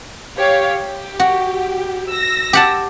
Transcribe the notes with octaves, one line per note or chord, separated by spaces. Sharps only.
G4 C#5 F5
G4
F#4
E6 A#6
G4 F#5 A5